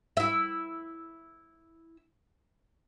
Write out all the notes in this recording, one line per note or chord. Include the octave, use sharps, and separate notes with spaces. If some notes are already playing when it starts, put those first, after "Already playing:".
E4 E5